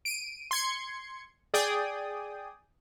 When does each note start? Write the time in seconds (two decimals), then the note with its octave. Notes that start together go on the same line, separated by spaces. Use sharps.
0.05 D7 D#7
0.51 C6 G#6 C#7
1.54 G#4 D5 G5 D#6